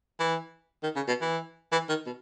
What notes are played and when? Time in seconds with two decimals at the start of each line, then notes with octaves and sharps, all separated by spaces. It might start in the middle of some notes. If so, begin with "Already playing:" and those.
0.20 E3
0.83 D#3
0.96 C#3
1.08 B2
1.22 E3
1.72 E3
1.89 D#3
2.06 B2